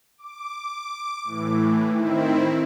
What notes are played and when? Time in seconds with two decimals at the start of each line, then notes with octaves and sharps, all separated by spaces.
0.17 D6
1.24 A2 E3
1.90 D#3 C4 E4